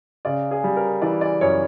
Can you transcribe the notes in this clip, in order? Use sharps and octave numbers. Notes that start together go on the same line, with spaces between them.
C#3 D5
G#4
G3
A#4
E3 D5
D5
F#2 C#5